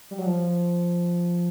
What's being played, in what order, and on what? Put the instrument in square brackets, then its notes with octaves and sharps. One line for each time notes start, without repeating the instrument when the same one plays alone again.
[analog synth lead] G3
F#3
F3